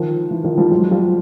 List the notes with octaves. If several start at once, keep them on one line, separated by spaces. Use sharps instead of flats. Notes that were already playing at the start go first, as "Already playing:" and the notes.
Already playing: D#3 F3
E3
D#3 F3
F3 G3
F#3 G#3
F3 G3